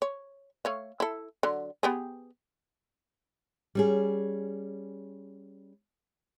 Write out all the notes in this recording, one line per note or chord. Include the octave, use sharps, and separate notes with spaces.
C#5
A3 C#5 F5
E4 A4
D3 F#3
B3 G4 G#4
G3 C#4 G#4